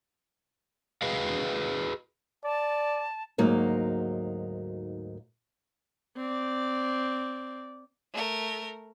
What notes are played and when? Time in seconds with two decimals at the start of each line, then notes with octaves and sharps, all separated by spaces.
1.02 F#4 G#4 B4 D#5 F5
2.44 D5 A5
3.38 D2 G#2 F#3 A#3 D#4
6.17 C4 D5
8.13 A3 A#4